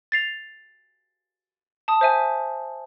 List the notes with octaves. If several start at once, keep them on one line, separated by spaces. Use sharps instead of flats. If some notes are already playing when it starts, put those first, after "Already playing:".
A6 C7 F7
A5 D#6
C5 E5 G#5